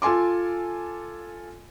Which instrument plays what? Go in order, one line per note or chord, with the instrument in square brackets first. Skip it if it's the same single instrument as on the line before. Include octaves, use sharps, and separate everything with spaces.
[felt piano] F4 A4 G#5 C6 D6